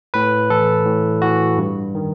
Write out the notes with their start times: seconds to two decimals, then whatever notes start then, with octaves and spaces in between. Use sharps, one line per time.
0.14 A2 B4
0.50 E3 A4
0.86 A2
1.22 E3 F#4
1.58 G2
1.95 D#3